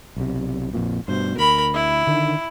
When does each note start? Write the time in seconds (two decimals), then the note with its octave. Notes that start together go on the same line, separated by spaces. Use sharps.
0.17 B1 C3
0.74 A#1 F2 A#2
1.08 G2 B2 C5
1.38 D2 A#4 B5
1.74 E4
2.07 D3 D#3